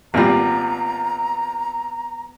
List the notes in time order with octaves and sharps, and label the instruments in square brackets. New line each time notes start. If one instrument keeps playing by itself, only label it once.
[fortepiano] G#1 A#2 G3 [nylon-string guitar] B3 F4 [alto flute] A#5